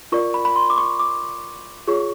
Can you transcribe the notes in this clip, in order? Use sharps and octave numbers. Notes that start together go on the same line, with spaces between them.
F4 A#4 D5 C#6
B5
B5
C6
D6
C#6
D6
F4 G#4 C#5 C#6